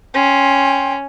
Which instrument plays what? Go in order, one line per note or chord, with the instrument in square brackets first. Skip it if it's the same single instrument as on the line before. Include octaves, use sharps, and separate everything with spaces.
[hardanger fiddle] C#4 [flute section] G5 C6